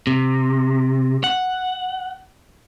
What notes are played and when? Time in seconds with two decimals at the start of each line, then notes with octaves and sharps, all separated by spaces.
0.07 C3
1.24 F#5